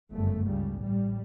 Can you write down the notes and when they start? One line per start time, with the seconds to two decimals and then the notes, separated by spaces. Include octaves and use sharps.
0.11 G1 F#2 C#3 A3
0.45 C#2 C#3 G3
0.80 A1 A2 G3